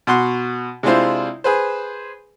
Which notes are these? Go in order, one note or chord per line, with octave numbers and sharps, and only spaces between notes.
B2 F#4 C6 F#6
C3 G#3 D4 E4 F4 C5
G#4 B4 C5